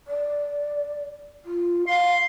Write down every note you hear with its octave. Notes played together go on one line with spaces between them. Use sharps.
D5
F4
F5 C6